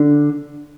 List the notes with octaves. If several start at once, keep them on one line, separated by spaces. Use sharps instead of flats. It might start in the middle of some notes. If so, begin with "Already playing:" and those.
Already playing: D3